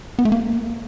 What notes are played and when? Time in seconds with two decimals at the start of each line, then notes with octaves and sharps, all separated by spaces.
0.19 B3
0.25 A3
0.32 A#3